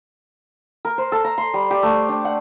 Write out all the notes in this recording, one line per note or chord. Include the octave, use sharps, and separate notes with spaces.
A#4
C5
A4
A#5
C6
G3
G4
A3
D4
F#5